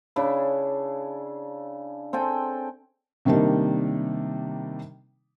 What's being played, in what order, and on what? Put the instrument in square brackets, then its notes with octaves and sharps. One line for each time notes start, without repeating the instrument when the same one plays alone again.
[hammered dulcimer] C#3 D4 E4
C4 A4 G5 G#5
[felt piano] C3 D#3 G3 A#3 D4 D#4